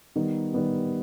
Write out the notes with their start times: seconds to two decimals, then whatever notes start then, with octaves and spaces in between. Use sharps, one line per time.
0.16 D#3 G3 B3 D#4
0.52 D#3 G3 B3 D#4